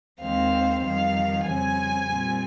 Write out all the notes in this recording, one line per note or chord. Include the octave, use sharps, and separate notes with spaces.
D#2 D#3 G#3 C4 F5
F2 D#3 G3 F5
F2 C#3 G3 C4 G#5
A#2 G3 C4